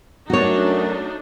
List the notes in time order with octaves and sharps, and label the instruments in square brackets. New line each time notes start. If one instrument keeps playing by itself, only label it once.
[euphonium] F#2 [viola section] A3 D4 D#4 [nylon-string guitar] F#4 C#5